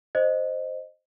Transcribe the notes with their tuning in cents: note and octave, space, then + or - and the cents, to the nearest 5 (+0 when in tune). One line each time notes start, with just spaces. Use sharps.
C5 +0 D#5 -15